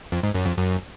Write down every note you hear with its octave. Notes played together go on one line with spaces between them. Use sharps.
F2
G#2
F#2
F2
F#2